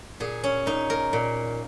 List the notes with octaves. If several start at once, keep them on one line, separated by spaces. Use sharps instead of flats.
A#2 G#4
C#4
A#2 D#4
A#4
A#2